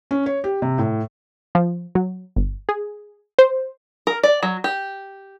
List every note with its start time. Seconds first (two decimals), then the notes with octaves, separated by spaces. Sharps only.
0.11 C#4
0.26 C#5
0.44 G4
0.62 C3
0.78 A2
1.55 F3
1.95 F#3
2.36 G1
2.69 G#4
3.39 C5
4.07 A#4
4.23 D5
4.43 F#3
4.64 G4